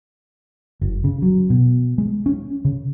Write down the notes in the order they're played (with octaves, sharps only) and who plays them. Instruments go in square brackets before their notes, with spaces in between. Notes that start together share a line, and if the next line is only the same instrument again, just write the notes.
[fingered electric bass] F#1
C#3
F#3
B2
G#3
C#4
C#3